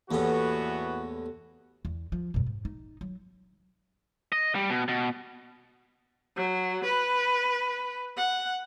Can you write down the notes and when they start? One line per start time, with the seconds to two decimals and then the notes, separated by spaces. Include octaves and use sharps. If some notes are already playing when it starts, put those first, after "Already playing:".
0.11 E2 A2 E3 A#3 B3 F#4 G4 A4
1.85 E2
2.12 F3
2.34 F#2 B2
2.46 G#2
2.65 D#4
3.01 F#3
4.32 D#5
4.55 G3
4.70 B2
4.88 B2
6.36 F#3
6.84 B4
8.17 F#5